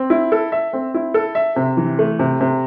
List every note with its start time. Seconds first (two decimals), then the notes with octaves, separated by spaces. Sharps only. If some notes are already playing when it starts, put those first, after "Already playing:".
Already playing: C4
0.10 E4
0.32 A4
0.52 E5
0.73 C4
0.94 E4
1.14 A4
1.35 E5
1.56 C3
1.77 E3
1.99 A3
2.19 C3
2.41 C3